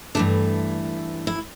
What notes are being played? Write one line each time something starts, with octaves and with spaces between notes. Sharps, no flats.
G2 E3 A3 D4
E4